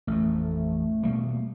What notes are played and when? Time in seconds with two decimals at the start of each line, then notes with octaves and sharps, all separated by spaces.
0.07 A1 F2 A3
1.03 B2 G3 A#3